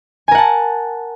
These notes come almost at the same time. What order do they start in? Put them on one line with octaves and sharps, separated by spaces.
G#5 A#4 F#5 A5